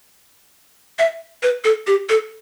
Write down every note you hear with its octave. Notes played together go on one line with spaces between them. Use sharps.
E5
B4
A4
G4
A4